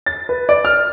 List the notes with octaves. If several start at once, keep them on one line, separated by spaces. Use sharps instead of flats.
A6
B4
D5
F6